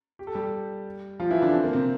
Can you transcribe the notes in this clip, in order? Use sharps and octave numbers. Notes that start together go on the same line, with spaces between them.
G4
A4
G3 G4
F3 F4
E3 E4
D3 D4
C4
A#3
C3 C4